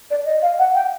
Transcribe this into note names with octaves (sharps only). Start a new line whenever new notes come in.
D5
D#5
F5
F#5
G5